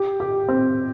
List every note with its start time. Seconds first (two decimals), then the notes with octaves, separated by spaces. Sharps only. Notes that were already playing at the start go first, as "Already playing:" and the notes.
Already playing: G4
0.20 G4
0.48 C4